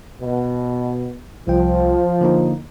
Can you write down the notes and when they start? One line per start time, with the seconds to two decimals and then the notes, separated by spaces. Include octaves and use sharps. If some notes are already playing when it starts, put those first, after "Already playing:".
0.21 B2
1.47 C2 F3 G5
2.21 D3 A#3 D#4